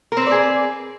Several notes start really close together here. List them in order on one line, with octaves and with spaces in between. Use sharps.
A#4 C4 B4 D5 G#4